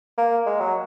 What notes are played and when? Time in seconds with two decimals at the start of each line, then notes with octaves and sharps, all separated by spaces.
0.18 A#3
0.46 G#3
0.60 F#3